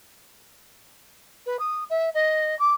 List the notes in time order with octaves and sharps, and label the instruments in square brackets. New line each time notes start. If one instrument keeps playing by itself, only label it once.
[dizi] B4
D#6
E5
D#5
D6